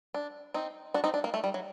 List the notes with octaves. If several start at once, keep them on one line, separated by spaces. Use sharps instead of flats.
D4
C4 D#4
D4 F#4
C4 D#4
D4
A#3
A3
G3
F#3